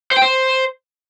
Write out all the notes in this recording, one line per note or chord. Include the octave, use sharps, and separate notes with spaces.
C5
G5
C5